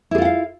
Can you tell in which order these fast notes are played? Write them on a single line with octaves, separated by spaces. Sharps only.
E4 G#4 F4 F#5 F5